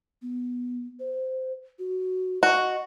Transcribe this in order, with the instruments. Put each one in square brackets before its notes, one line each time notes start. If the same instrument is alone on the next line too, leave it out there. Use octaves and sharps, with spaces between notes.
[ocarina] B3
C5
F#4
[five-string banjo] F#4 [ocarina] D#5